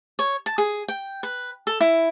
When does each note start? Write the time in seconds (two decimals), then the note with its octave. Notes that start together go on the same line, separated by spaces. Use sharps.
0.19 C#5
0.46 A5
0.58 G#4
0.88 G5
1.23 B4
1.67 A4
1.81 E4